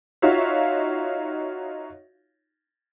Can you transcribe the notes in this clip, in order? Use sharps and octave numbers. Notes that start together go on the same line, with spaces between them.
D#4 F4 F#4 C#5 E5 F5